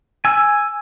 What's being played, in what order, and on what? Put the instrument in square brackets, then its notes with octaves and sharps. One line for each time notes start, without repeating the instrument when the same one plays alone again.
[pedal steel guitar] G#5 E6